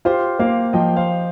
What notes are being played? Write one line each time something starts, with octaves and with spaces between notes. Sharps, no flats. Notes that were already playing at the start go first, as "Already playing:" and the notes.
F4 G4 C5
A#3 C5 F5
F3 D#5 G5
C5 F5